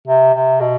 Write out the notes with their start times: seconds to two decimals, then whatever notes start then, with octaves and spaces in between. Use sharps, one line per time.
0.07 C3
0.34 C3
0.60 B2